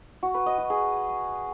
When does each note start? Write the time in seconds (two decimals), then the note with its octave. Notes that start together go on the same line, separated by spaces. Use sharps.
0.23 F#4
0.34 B4
0.46 D#5
0.58 F#4
0.70 G#4